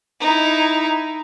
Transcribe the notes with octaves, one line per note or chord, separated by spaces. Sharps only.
D#4 E4